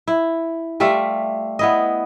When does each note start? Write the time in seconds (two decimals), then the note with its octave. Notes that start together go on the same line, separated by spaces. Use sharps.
0.08 E4
0.80 G3 A3 F4 E5
1.59 B3 E4 D#5